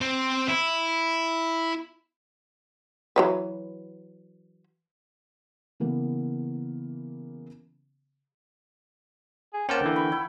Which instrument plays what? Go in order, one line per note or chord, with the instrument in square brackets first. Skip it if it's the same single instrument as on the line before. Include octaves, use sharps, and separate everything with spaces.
[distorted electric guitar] C4 C5
E4
[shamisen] E3 F#3 B4
[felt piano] C#3 E3 A#3 B3
[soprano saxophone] G#4
[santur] A#3 A#4 F#5 [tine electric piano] C#4 C5 A5 [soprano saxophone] G5
[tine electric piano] D3 E3
[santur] B5 C#6
E4